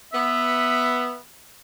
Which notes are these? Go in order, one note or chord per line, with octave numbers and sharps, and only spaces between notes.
B3 E5